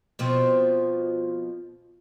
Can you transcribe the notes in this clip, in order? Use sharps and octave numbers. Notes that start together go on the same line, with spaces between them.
B2 F3 C4